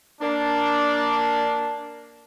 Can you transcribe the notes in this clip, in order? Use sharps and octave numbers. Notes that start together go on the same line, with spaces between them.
A#3 D4